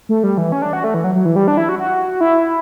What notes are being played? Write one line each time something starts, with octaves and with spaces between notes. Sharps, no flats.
A3
G3
E3
C#4
D4
F#4
A3
E3
F#3
F#3
E3
G3
D4
E4
F#4
F#4
E4